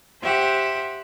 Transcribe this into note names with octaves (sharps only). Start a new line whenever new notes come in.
G4 C5 E5 F#5